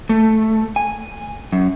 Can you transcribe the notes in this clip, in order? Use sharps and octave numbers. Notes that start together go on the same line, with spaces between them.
A3
G#5
F#2